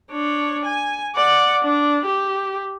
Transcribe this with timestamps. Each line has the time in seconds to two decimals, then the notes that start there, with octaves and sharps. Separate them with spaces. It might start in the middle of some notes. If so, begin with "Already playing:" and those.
0.12 D4 C#5
0.65 G#5
1.15 D5 F#5
1.63 D4
2.05 G4